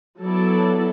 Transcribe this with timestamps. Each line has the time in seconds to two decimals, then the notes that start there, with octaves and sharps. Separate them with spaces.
0.22 F#3 B3 E4 A4 D5